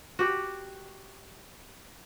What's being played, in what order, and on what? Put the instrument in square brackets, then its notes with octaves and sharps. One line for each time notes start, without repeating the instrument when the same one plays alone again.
[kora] F#4 G4